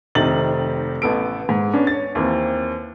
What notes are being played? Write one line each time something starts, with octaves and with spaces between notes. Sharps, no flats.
F1 C3 D#3 D#4 A6 F#7
A1 B3 A4 D7
G#2
B3 C#4 D4
C#5 A6
D#2 E3 A#3 C4